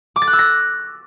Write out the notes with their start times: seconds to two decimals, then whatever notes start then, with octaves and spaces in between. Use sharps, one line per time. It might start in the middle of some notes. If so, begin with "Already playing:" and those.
0.16 D6
0.22 A6
0.27 F#6
0.33 E6
0.39 A#6